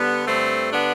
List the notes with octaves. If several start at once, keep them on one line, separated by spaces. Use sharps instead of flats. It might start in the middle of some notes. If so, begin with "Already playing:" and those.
Already playing: D3 G3 B3
G2 A3 C4
D3 B3 D4